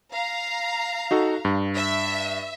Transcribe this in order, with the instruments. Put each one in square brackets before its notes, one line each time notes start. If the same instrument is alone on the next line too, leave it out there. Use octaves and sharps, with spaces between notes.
[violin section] F5 A#5
[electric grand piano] D#4 F#4 A4
G2
[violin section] E5